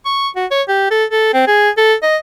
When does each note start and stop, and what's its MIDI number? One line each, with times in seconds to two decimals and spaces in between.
0.06 0.28 85
0.36 0.46 66
0.51 0.62 73
0.69 0.88 67
0.91 1.05 69
1.10 1.30 69
1.34 1.45 60
1.48 1.70 68
1.78 1.94 69
2.03 2.17 75